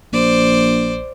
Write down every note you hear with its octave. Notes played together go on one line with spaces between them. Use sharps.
A#1 C5 D5